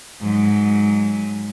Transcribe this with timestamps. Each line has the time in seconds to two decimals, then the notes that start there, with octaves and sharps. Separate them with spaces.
0.21 G#2 F#3